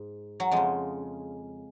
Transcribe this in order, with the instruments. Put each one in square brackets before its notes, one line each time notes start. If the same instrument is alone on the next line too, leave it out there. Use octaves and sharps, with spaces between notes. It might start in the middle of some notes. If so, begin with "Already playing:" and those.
Already playing: [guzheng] G#2
F#3
F2 C#3 G#3